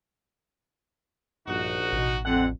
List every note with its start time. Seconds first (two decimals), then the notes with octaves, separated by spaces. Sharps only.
1.47 A#1 G2 D#4 F#4
1.93 A1 B2
2.25 F2 D3 C4 F#5